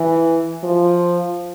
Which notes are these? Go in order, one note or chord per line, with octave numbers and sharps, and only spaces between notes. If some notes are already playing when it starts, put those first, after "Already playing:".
Already playing: E3
F3